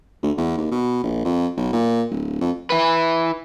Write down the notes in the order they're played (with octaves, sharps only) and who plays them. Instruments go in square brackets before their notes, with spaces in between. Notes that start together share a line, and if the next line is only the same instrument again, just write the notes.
[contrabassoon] D2
E2
D#2
B2
A#1
F2
B1
A#2
D1
F2
[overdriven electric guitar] E4 B4